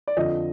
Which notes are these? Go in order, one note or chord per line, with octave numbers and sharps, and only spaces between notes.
D5
F2 D3 F3 D#5